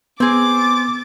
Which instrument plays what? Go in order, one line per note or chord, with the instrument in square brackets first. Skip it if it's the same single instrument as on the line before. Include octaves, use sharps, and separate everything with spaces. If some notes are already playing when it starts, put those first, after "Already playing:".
[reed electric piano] B3 [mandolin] C4 G#4 [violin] D6 A6